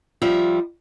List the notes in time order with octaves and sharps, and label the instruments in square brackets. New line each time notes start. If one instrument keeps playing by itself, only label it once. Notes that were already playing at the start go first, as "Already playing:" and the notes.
[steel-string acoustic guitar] F3 G3 E5